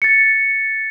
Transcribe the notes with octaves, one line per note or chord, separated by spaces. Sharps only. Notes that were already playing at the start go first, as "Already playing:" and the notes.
A6 C#7